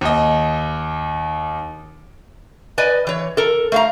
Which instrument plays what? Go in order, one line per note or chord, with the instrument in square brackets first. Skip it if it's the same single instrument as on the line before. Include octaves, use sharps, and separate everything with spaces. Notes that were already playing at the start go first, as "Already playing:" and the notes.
[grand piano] D#2 D#5
[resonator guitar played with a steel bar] B4 D5 D#5 G#5
E3 C#5
A4 A#4
A3 F5 A#5